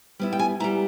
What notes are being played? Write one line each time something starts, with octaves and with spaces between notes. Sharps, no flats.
G3 B3 E4
G5
G#5
G3 B3 E4 A#5